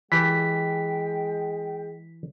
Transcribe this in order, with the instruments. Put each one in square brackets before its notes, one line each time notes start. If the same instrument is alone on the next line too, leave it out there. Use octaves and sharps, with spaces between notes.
[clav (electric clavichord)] E3 G4 A4 [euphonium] G#3 [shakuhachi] G5 [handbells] B6